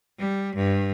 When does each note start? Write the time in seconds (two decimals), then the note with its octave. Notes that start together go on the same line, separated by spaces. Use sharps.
0.19 G3
0.56 G2